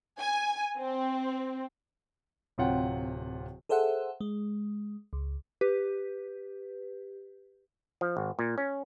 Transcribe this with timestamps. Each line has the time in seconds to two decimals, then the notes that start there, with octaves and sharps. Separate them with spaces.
0.19 G#5
0.78 C4
2.58 D1 C3 F4 C#5 F#5 G5
3.69 G#4 A4 C5 E5 F#5
4.21 G#3
5.13 C#2
5.61 G4 B4
8.01 F3
8.17 G#1
8.39 A#2
8.58 C#4